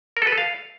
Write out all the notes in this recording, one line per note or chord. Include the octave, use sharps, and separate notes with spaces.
A#4
A4
B4
A4
F5